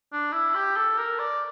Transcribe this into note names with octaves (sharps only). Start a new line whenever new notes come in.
D4
E4
G4
A4
A#4
D5